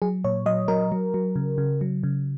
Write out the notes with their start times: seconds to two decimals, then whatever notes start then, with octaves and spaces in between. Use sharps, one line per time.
0.02 F#3 G#4
0.25 A#2 C#5
0.46 F#3 D#5
0.68 F#3 A#4
0.92 F#3
1.14 F#3
1.36 C#3
1.58 C#3
1.81 F#3
2.03 C#3